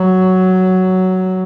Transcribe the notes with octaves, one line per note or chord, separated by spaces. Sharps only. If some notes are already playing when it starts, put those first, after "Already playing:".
Already playing: F#3